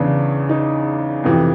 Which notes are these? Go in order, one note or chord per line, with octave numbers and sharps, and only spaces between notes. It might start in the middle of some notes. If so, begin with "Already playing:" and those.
Already playing: E2 C#3 E3 D4
D#4
F2 C3 E3